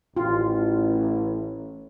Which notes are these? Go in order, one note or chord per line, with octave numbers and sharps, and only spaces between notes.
A1 F4